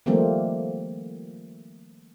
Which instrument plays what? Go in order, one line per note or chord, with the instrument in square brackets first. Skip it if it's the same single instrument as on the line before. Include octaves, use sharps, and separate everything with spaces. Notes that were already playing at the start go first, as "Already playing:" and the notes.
[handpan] D#3 F3 G3 A3 A#3 C4